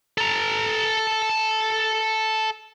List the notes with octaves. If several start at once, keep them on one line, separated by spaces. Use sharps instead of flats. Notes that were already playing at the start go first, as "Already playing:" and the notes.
A4 A#5